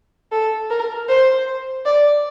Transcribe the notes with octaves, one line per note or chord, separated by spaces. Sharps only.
A4
A#4
C5
D5